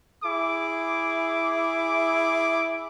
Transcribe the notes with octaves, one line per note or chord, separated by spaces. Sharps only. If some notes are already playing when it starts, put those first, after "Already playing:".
E4 G#4 D6